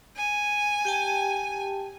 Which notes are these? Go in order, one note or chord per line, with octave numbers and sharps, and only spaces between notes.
G#5
G4 G5 A5